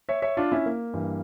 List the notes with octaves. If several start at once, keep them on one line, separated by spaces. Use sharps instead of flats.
C#5 E5
C#5 E5
D4 F4
C#4 E4
A#3
G2 E3